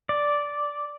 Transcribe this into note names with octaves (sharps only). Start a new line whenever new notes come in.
D5